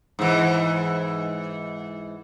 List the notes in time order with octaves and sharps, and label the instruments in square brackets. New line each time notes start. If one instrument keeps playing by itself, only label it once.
[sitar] G#2 E3